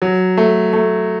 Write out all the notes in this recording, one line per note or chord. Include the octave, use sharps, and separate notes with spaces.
F#3
A3
A3